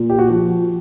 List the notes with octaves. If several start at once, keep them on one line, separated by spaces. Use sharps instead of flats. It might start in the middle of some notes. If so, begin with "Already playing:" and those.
Already playing: A#2
G4
F#4
F3